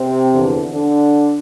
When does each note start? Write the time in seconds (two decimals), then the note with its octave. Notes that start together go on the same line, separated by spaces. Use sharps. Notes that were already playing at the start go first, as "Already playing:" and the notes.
Already playing: C3 C4
0.32 E2 D3 F3
0.71 D3 D4